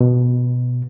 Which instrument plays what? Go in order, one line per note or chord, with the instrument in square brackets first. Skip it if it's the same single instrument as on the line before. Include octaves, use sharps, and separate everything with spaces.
[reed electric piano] B2